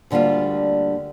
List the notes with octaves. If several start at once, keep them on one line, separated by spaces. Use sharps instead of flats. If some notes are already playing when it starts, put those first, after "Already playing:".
D2 D3 G3 A#3 F4